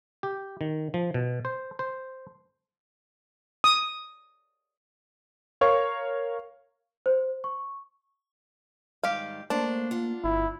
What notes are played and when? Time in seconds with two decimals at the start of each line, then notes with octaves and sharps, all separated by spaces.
0.23 G4
0.61 D#3
0.94 F3
1.14 B2
1.45 C5
1.79 C5
3.64 D#6
5.61 A#4 C#5 F5 C#6
7.06 C5
7.44 C#6
9.04 G#2 D#3 G3 G4 F5
9.50 G#2 A3 A#3 D4 C5
9.91 F4 F#5
10.24 G1 E4